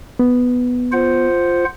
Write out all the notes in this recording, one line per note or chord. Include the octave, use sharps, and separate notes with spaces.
B3
F4 C5 F#5